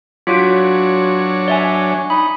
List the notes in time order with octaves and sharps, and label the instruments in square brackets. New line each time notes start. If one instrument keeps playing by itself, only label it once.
[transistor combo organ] F#3 D4 C#5 [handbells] F4 F#4 D7
[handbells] D5 E5 G#5
[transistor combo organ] D#4 [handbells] B5